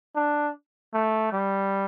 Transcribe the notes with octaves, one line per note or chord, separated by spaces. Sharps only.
D4
A3
G3